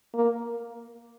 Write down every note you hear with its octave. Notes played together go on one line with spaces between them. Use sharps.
A#3